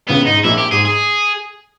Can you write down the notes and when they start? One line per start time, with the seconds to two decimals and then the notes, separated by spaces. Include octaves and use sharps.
0.09 C#2 C#3 B3
0.26 G#2 D#4
0.44 A#1 A#2 E4
0.58 G4
0.71 G#2 G#4
0.85 G#4